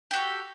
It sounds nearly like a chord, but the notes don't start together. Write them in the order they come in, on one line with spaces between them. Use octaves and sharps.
G4 F#4 A4